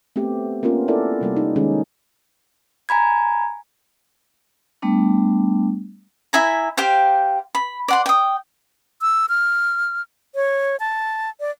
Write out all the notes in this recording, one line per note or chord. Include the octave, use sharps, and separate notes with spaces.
A3 B3 C4 G4
A#3 B3 C#4 F4 A#4
E4 A4 A#4 D5
C3 G3 A#3
D#4
D#3 G#3 C#4 D#4
G#5 A#5 B5 G#6
G3 A3 B3 D4
E4 E5 G#5 A#5
G4 C5 F5 G5
B5
D5 F#5 C6
G5 D#6
E6
F6
C#5
A5
D5